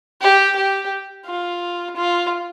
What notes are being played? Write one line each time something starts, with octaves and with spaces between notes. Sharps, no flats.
G4
G4
F4
F4